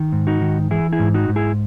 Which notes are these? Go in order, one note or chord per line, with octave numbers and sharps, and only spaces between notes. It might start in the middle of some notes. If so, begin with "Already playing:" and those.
Already playing: D#3
G#2
D#4 F#4
D#3
E3 E4 G#4
E4 G#4
G#2
D#4 F#4
G#2
E4 G#4